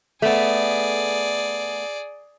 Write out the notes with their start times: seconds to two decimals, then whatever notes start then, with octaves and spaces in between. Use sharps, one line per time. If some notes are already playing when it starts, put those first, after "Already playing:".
0.22 A3 B3 G#4 D5